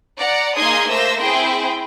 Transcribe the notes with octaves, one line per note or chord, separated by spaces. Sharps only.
D5 F#5 A#5
A#3 D#4 G#4 C6 D#6 G#6
A3 A#3 C5 E5 E6 A#6
C4 E4 G#4 G5 C6